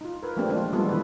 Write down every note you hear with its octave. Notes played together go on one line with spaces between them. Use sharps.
D#4 F4
A#4 B4
F3 A3 A#3 C4 D4 G4
E3 G#3 D4 F4
E3 G3 G#3 B3 F4 A4
D#3 A#3 E4 B4